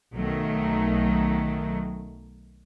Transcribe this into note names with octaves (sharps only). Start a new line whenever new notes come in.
B1 D#3 F#3 A3